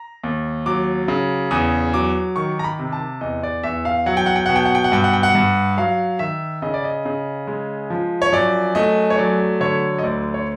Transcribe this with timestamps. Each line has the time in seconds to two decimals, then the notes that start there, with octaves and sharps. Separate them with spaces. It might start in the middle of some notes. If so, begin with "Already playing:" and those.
Already playing: A#5
0.23 D#2
0.66 F#3 D6
1.08 C#3
1.51 E2 D#6
1.93 F#3 D6
2.36 D#3 C#6
2.59 A#5
2.64 B5
2.79 C3
2.92 A5
3.21 E2 D#5
3.43 D5
3.63 E2 E5
3.85 F5
4.06 F#3 F#5
4.17 G5
4.26 F#5
4.36 G5
4.46 B2 F#5
4.56 G5
4.65 F#5
4.75 G5
4.84 F#5
4.92 G2 G5
5.04 F#5
5.13 G5
5.23 F#5
5.35 G2
5.77 F#3 F5
6.19 D#3 E5
6.62 C#3 D#5
6.74 D5
6.84 D#5
7.06 C#3
7.47 G#3
7.90 F3
8.22 C#5
8.32 F#2 D5
8.75 A3 D#5
9.10 C#5
9.18 F#3 D5
9.60 D3 C#5
9.99 D#5
10.03 D2 D5
10.34 C#5